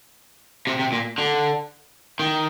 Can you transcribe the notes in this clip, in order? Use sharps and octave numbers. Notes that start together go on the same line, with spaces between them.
C3
C3
A#2
D3
D#3